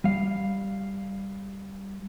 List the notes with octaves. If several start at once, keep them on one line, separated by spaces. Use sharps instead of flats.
G3 F5